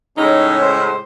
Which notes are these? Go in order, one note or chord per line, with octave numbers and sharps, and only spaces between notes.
A2 C#3 G#3 C#4 D#4
C5